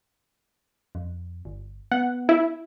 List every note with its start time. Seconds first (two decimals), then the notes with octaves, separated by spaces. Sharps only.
0.95 F2
1.45 G1
1.91 B3 F#5
2.29 E4